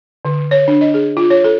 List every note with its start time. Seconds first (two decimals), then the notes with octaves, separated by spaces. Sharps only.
0.25 D3
0.51 C#5
0.68 D4
0.81 D#5
0.94 G#4
1.17 F4
1.30 C#5
1.44 A4